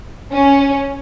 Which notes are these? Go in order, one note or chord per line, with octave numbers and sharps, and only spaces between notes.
C#4